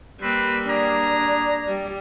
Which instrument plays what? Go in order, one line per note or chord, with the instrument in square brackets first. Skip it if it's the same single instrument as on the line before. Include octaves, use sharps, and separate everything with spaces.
[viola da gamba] G3 A#3 [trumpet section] C4 B4
[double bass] D4 [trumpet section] G#4 A#5
[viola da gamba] G3